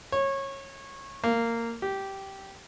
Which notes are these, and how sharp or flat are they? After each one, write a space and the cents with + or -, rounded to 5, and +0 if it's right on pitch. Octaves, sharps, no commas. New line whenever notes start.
C#5 -20
A#3 -15
G4 -10